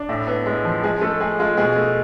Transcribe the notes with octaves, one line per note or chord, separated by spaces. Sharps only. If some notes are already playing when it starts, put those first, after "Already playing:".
Already playing: D4
A2 E4
B3
G#3
F3
G#3 G#4
G#3 A3 A4
G#3 G#4
G#3 F4
B2 G#3 G#4
A3